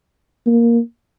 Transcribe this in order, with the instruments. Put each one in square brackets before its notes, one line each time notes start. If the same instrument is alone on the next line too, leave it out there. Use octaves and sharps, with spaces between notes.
[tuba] A#3